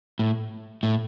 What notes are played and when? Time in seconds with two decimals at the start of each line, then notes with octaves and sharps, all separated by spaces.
0.19 A2
0.83 A2